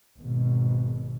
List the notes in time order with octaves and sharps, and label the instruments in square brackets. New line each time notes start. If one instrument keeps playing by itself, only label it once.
[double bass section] G#1 B2